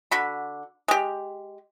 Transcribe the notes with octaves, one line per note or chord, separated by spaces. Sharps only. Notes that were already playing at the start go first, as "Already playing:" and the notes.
D3 F#4 B5
G#3 G4